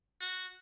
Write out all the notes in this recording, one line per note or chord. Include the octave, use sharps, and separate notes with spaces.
F#4